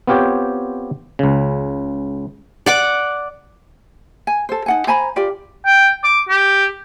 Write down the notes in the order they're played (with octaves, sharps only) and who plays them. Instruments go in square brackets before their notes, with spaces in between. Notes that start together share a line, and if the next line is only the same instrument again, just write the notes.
[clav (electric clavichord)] B3 C4 F4 G4 C#5 G5
C#2 C#3
[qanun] D5 F#5 D6
[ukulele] G#5
A4 C5
D#4 F#5 G#5
C5 G#5 A#5 B5
F4 G4 D5
[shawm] G5
D6
G4